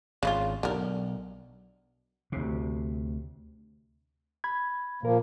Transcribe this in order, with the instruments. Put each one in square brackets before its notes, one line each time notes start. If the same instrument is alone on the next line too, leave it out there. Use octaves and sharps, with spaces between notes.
[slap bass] G#1 [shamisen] C#3 E4 F4
[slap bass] B1 [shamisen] D3 A#4
[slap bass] D2 C3
[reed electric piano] B5 G#6
[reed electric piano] A#2 A#4 [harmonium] F3 A#3